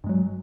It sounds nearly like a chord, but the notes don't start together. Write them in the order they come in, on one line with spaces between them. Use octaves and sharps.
G2 G#3 F#3